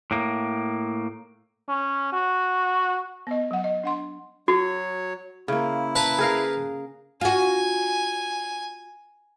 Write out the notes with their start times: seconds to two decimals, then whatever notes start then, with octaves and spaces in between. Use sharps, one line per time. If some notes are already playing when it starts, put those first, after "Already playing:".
0.11 A2 A#3
1.69 C#4
2.13 F#4
3.27 B3 D#5
3.51 F#3 F#5
3.64 D#5
3.83 D4 F#5 C6
4.48 F#3 F#4 C#5
5.48 C#3 A#3 E4
5.95 B4 A5 A#5
6.18 G#4 A#4 F5
7.21 F4 F#4 G#5